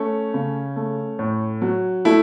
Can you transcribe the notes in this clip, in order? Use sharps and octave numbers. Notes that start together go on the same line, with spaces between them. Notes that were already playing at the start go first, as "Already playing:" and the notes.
Already playing: A3 C#4
C#3
A3
A2
F#3
A3 E4